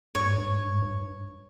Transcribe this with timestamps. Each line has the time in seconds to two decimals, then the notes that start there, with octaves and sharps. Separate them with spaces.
0.15 G2 C#5
0.26 G#2
0.38 G2
0.49 G#2
0.60 G2
0.71 G#2
0.82 G2